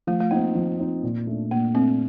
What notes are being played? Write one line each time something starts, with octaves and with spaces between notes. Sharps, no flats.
F3 A3
A3
A#3 C4 D#4
F3
C4 D#4
A#2
A3 D4
A#2 A#3
A3 C4 D4